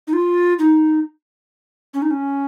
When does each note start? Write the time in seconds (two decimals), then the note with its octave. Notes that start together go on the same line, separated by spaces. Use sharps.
0.08 D#4
0.13 F4
0.59 D#4
1.94 C#4
2.02 D#4
2.11 C#4